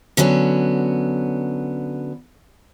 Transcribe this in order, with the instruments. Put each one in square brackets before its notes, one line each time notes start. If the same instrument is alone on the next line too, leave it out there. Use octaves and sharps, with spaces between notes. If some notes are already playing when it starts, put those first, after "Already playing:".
[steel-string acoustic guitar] D3 F#3 B3 C#4